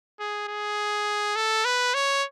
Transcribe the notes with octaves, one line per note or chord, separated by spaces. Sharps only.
G#4
G#4
A4
B4
C#5